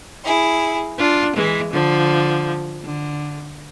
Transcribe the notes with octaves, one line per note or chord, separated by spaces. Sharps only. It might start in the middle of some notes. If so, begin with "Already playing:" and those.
E4 G#4
D4 F4
E3 G#3
D3 F3
D3